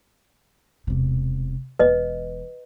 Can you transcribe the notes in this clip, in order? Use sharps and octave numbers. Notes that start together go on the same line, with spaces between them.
E1 C3
E1 E3 B4 D#5